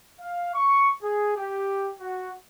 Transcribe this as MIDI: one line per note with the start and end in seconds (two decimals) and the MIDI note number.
0.20 0.54 77
0.54 0.90 85
1.03 1.35 68
1.37 1.89 67
2.00 2.32 66